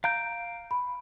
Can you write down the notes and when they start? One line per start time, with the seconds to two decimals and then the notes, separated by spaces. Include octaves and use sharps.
0.04 F5 A#5 G6 D7
0.71 B5